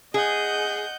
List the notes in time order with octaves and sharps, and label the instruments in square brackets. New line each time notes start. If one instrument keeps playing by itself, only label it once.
[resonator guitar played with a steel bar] G#4 [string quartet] D#5 F#5 G6